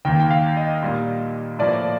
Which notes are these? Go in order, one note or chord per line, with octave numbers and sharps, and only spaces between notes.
D#2 D#3 A#3 G5
G5
F5
D#5
A#2 G3 A#3
A2 F3 A#3 D5